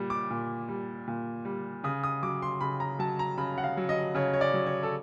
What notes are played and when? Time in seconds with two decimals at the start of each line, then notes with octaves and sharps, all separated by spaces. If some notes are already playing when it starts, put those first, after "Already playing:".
Already playing: A#2 G3
0.10 D6
0.31 A#2
0.68 G3
1.08 A#2
1.45 G3
1.84 C#3 D#6
2.04 D#6
2.23 F#3 D6
2.42 C6
2.61 C#3 B5
2.80 A#5
2.99 F#3 A5
3.19 A#5
3.38 C#3 B5
3.58 F#5
3.64 F5
3.77 F#3
3.89 D#5
4.15 C#3 C#5
4.33 C#5
4.41 D5
4.54 F#3
4.66 C#5
4.83 A4